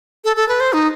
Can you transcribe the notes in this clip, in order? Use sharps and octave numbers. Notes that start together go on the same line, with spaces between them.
A4
A4
B4
C5
D#4